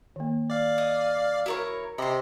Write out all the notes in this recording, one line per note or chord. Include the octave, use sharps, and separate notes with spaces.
D#3 A#3
D5 F5
D#5
E4 F#4 A#4 C#5
C3 D#5 B5 C6